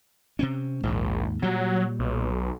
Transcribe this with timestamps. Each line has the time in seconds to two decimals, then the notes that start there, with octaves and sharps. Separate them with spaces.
0.39 C3 C4 C#4
0.83 A#1 D#2 G#2
1.42 A#2 F#3 G3
1.99 B1